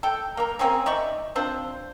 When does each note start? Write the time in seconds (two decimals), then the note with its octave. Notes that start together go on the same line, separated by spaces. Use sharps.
0.03 A4 G5
0.37 A#3 A#4
0.59 A#3 C4 C#4 G#4
0.86 D#4 D5 E5 C#6
1.35 C4 D4 F4 C5